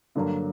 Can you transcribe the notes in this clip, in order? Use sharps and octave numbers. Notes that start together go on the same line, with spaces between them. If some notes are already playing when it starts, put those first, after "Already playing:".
G2 D3 F#3 A#3